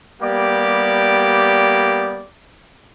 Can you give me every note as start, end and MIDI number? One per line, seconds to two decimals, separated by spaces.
0.22 2.26 55
0.22 2.26 58
0.22 2.26 59
0.22 2.26 67
0.22 2.26 74
0.22 2.26 86